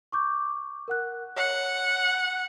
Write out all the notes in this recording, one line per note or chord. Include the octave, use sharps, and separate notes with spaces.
C#6 D6 G6
A#4 F#5 F#6
C#5 F#5